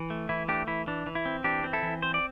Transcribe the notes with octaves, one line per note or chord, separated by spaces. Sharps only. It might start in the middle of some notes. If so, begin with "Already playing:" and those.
Already playing: E3
A3
E3 E4
A3 D4 G4
E3 E4
E3 D4
E3
E4
C4
E3 D4 G4
C4
E4 A4
E3
C4 C5
D5